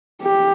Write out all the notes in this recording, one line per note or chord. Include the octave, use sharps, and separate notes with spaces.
G4